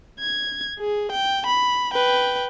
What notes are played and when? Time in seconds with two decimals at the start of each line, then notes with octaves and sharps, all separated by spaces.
0.20 G#6
0.80 G#4
1.12 G5
1.46 B5
1.93 B4 G5